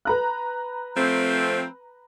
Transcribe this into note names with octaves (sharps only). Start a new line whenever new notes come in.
B4 A#5 F#6
F3 A3 C4